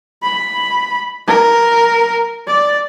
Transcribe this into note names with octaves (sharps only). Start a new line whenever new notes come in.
B5
A#4
D5